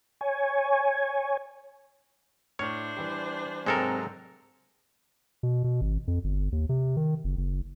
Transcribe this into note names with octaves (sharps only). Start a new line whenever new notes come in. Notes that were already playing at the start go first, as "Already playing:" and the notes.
C#5 G#5
A2 D4 C5 C#5 F6
E3 G3
G#2 C3 F#3 G#3 C4 A4 A#4
B2
B2
G#1
F2
G1
D#2
C3
D#3
F#1
F#1